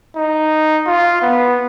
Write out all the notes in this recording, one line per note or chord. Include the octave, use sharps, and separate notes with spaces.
D#4
F4
B3